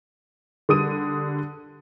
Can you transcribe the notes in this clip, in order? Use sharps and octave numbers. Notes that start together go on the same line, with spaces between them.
D3 G3 D#6 D#7